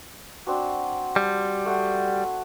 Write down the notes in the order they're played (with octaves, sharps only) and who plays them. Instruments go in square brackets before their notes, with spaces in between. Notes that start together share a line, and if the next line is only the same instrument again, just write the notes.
[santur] C4 D4 F#4
[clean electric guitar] G3 [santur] A5
[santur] A3 F#5 C6